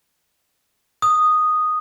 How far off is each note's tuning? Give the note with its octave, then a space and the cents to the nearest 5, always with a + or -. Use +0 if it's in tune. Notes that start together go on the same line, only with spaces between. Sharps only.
D#6 -5